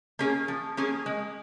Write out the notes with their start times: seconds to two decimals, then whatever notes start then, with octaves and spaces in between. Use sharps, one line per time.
0.19 A#3 C#4 G#4
0.48 F3
0.77 A#3 C#4 G#4
1.06 G#3